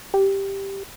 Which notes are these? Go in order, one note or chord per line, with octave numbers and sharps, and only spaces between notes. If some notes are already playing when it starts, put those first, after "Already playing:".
G4